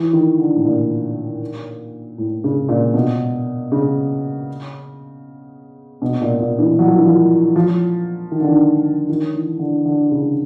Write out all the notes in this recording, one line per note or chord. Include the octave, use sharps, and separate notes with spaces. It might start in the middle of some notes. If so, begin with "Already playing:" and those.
Already playing: E3
D#3
D3
A2
A#2
A2
C#3
A#2
B2
C#3
B2
A#2
A#2
E3
F#3
F3
E3
F3
F3
D#3
D3
D#3
D#3
E3
D3
D3
C#3